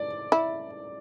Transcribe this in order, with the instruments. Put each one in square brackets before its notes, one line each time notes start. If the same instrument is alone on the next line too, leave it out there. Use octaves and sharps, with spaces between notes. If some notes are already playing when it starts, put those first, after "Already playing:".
Already playing: [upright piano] D5
[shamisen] E4